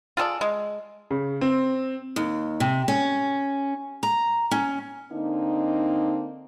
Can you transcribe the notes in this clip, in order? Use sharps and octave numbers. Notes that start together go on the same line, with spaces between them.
F4 G#4 A4 D5
G#3
C#3
C4
D#2
C3
C#4
A#5
C#4
D3 A#3 C4 D4 D#4